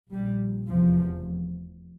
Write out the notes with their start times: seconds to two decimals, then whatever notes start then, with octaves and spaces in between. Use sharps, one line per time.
0.12 A#1 A#2 G3
0.68 F1 E2 C3 F3